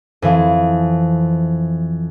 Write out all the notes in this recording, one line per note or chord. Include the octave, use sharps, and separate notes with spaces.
F2 E3